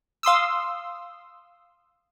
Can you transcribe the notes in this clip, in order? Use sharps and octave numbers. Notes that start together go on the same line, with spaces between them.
F5 C6 D#6 E6